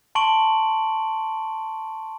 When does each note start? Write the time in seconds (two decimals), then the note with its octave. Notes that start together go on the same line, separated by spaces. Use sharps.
0.15 A5 C6 C#6 D7 F#7